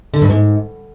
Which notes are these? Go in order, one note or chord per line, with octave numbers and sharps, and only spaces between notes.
D3
G2
G#2